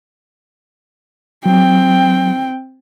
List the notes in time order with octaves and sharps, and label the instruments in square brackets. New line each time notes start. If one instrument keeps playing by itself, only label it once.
[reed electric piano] F#3 [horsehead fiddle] C4 G5